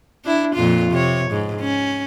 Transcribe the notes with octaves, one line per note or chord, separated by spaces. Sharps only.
D4 E4
F2 A#2 F4
C3 C#5
G#2
C#4